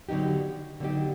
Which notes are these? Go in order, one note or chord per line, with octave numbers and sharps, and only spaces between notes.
D3 F#3 B3 D#4 G4
D3 F#3 B3 D#4 G4